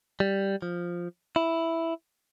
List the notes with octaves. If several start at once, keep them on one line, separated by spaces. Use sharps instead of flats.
G3
F3
E4